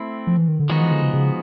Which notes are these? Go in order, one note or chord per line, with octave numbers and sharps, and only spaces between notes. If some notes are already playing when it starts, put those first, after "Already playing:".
Already playing: A3 C4 E4
F3
E3
D#3
D3
D#3 F3 G#3 B3 D#4 F#4
E3
D3
C#3
C#3